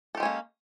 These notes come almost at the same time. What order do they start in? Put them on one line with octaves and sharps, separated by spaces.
A4 G4 G#3 C#4 A#3